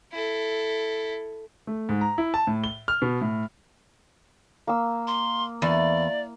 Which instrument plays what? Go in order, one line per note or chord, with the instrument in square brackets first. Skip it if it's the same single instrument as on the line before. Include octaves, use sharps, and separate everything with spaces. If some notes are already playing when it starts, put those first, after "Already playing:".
[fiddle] E4 A4
[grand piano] A3
G#2
A#5
E4
A5
A2
G7
F6
B2
A2
[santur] A#3 E6
[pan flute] C6
[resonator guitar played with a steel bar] E2 [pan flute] D5